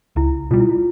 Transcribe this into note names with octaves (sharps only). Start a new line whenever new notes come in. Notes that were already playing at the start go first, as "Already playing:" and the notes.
C#2 E4
B2 G3 F4
E4
F4